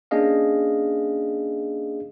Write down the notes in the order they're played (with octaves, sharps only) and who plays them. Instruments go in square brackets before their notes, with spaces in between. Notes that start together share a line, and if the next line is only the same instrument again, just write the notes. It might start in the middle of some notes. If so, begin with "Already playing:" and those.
[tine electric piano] A#3 C#4 D4 G#4 D#5 F5